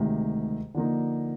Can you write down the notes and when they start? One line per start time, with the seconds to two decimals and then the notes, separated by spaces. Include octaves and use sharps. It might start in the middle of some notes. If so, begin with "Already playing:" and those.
Already playing: D2 C3 D#3 G#3
0.74 D3 F3 A#3 D#4